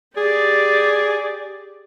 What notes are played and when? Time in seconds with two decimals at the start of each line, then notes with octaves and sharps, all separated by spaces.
0.17 G4 G#4 D5